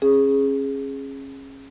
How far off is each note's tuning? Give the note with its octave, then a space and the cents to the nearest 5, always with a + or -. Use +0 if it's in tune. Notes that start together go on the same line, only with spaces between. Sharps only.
C#4 -30 G#4 +0